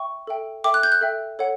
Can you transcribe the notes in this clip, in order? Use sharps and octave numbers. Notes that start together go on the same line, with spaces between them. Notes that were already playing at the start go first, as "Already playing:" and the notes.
Already playing: E5 G5 C#6
A4 E5 G5
A4 E5 G5 D6
F#6
G6
F#6
A4 E5 G5
A4 C#5 F#5